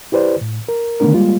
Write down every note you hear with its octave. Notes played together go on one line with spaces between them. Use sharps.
E4 G4 B4 C5 D5
A2
A#4
D3 D#3 A3 B3 D4 A#4
G3 G#3 A#3 F4